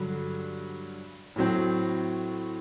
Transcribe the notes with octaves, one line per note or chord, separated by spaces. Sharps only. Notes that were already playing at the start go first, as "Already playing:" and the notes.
Already playing: G2 D3 F#3
A2 F#3 C4